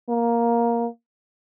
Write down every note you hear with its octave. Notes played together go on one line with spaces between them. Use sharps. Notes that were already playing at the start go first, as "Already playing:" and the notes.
A#3